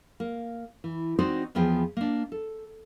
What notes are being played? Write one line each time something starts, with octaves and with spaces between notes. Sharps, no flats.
A#3
E3
C4 D#4 F#4 C5 D5 D#5
E2 F3 B3 G#4 C5 G5
A#3 D4
A4